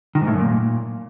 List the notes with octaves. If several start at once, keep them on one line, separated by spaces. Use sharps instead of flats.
D#3
G#2
A2
F#2
A#2